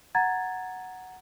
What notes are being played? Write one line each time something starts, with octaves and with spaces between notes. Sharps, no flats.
F#5 A#5 G#6 A6